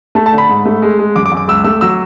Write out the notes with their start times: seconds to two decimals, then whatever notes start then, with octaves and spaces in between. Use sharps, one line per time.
0.15 A3 A5
0.26 A5
0.33 D3
0.38 B5
0.49 G#2
0.65 A3
0.82 G#3
0.99 G#3
1.15 F#2 D6
1.26 D6
1.32 F#2
1.37 D6
1.48 C#2 E6
1.64 A3 E6
1.81 F#3 E6